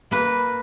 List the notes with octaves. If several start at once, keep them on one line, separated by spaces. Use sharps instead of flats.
A#3 B4